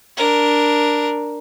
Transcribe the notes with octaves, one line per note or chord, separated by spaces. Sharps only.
D4 A#4